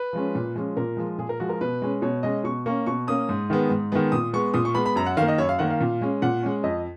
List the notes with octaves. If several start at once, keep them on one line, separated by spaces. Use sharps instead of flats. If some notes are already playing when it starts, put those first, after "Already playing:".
Already playing: B4
F3 G#3 C#4
A#2
F3 G#3 C#4
A#2 A#4
F3 G#3
A#2 G#4
A#4
F3 G#3 F#4
A#4
B2 B4
G#3 C#4
B2 C#5
G#3 C#4 D#5
B2 C#6
A#3 C#4 C#6
B2 C#6
A#3 C#4 D#6
G#2
D#3 G#3 B3
G#2
D#3 G#3 B3
A#2 D#6
G#3 B3 C#6
A#2 D#6
C#6
G#3 B3 B5
B5
F#2 A#5
F#5
D#3 F5
A#3
D#5
F#2 C#5
F5
D#3 A#3 F#5
F5
A#2
G#3 C#4
A#2 F#5
G#3 C#4
F2 D#5